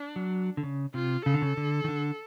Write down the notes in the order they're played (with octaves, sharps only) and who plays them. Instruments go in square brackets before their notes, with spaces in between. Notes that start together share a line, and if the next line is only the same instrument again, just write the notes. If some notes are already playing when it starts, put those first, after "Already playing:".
Already playing: [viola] D4
[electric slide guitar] F#3
D3
C#3
[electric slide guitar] C3 [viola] F4
[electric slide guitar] C#3 [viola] A4
[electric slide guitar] D3
C#3
D3
D#3
D3